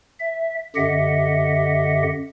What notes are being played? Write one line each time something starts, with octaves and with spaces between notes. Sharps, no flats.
E5
F#2 D3 G4 D#5 E5 F#5